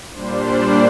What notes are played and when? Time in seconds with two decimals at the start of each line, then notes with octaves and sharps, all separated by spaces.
0.13 A#2 G3 D4 C5
0.45 D5